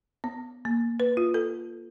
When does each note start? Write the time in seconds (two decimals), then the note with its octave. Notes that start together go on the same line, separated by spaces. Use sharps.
0.24 B3
0.65 A#3
1.00 B4
1.17 F4
1.34 A4